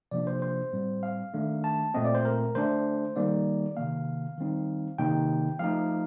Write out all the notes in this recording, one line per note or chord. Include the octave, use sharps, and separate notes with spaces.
C3 F3 A#3 D4 D5
C5
C5
A2 G3 C4
F5
D#3 A3 D4
A5
A#2 A3 C4 D#5
D5
C5
A#4
D3 A3 D4 C5
D#3 G3 A#3 D#4 D5
C3 D#3 A#3 F5
D#3 G3 C4 D#4
C3 D#3 A#3 D#4 G5
F3 A3 D#4 F5